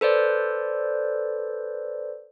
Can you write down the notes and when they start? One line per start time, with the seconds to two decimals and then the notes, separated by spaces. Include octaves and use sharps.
0.01 A4 B4 C5 D5